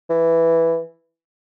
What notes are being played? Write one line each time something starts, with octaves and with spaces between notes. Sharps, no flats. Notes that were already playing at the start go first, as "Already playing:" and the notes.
E3